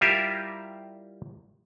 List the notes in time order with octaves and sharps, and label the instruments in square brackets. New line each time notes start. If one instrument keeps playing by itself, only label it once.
[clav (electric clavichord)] G3 E4 F4 G4 A#4 E5